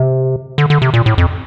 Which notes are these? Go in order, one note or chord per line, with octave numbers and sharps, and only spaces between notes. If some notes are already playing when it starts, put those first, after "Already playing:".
Already playing: C3
D3
D3
C3
A#2
A2
F2